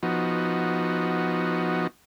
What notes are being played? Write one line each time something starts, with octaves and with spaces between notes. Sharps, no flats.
F3 B3 D#4 F#4